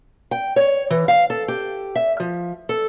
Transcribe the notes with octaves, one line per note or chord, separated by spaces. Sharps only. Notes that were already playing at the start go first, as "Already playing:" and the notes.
G5
C#5
E3
F5
A4
G4
E5
F3
A4